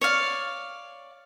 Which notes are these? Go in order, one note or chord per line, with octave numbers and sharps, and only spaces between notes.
C#5 D5 F5